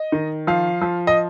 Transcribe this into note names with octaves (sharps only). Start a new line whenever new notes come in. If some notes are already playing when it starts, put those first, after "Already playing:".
Already playing: D#5
D#3
F3 F5
F3
D#5